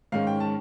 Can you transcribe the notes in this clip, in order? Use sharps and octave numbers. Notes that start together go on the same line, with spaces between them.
G#2 D#3 G#3 C#4 F5
G5
A5